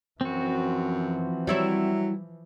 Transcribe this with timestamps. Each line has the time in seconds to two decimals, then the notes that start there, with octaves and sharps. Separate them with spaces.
0.21 F#2 E3 F3 C4 F#4
1.47 F#3 G3 E4 C#5